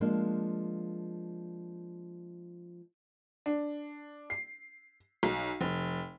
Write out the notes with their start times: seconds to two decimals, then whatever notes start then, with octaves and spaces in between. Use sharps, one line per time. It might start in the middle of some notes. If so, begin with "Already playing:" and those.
0.01 F3 G#3 A#3 D4
3.46 D4
4.30 C7
5.23 B1
5.61 F1